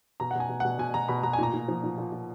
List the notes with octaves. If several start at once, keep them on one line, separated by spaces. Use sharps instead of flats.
B2 A#5
F#5
B2 G#5
B2
B2 F#5
B2 G#5
B2 A#5
B2 B5
B2 A#5
G#5
A#2 A#5
A#2
F3
A#2
A#2
A#2